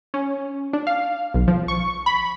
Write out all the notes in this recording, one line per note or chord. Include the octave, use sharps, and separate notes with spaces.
C#4
D4
F5
B1
F3
C#6
B5